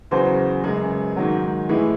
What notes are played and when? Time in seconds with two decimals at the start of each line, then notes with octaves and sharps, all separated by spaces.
0.11 E2 C#3 F#3 C5
0.64 F#2 C#3 G#3 G#4
1.16 G#2 D#3 F#3
1.69 A2 E3 G#3 G#4